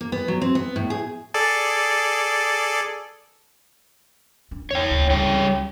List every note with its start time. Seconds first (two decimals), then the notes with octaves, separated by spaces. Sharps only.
0.01 A#3
0.12 B3
0.28 F#3
0.42 C4
0.55 B3
0.76 A2
0.90 G#4
1.34 G#4 A4 D5
4.51 D4
4.71 E2 C#5 G5
4.90 D2
5.10 C#2 G3 C#5 G5